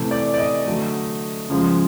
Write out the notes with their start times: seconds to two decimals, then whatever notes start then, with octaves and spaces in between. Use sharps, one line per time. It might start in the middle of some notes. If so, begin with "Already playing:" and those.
Already playing: C3 E3 A3
0.11 D5
0.34 D5
0.38 D#5
0.66 D3 F#3 A3
1.49 C#3 F3 G#3